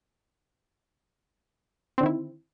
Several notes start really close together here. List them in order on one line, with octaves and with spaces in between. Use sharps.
C4 D3 D#3 E4